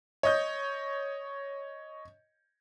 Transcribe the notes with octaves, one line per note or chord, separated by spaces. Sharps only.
C#5 D#5 G6